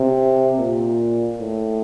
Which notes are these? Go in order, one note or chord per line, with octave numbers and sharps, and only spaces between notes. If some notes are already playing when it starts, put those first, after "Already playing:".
Already playing: C3
A#2
A2